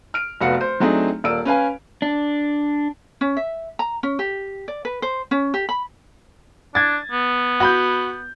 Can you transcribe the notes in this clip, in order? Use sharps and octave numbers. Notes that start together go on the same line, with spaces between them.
F6 D7
F1 B3 F#4 F5 F#5 C#7
C5
F#3 A3 C4 D4 D#4 G#4
D#1 A#3 D5 E6 D7
C#4 B4 F5 G#5
D4
C#4
E5
A#5
C#4
G4
D5
B4
C5
C#4
G4
B5
D4 G#6 A6
B3
F#4 B5 G6